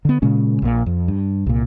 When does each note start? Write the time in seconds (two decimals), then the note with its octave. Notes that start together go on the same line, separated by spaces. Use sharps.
0.05 D3 B3
0.22 A#2 C#3 G#3 C#4
0.62 A#1 A#2
0.86 F2
1.08 G2
1.46 C2 A#2